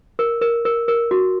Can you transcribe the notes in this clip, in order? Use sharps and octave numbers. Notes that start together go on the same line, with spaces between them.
A#4
A#4
A#4
A#4
F#4